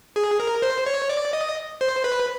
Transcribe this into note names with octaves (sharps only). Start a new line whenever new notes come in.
G#4
A#4
C5
C#5
D5
D#5
C5
B4